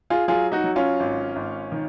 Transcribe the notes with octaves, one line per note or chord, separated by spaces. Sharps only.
F4 G#4
F#3 F4 G#4
D#4 F#4
F#3
C#4 F4
G#1
G#1
D#3